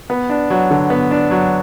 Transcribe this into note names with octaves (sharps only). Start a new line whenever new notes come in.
B3
D4
F#3
D3
B3
D4
F#3